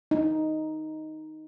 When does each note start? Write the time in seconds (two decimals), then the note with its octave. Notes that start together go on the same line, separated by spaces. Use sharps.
0.11 D#4